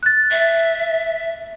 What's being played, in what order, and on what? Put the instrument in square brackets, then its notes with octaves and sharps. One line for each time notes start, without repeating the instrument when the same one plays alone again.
[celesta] F#6 A6
[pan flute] E5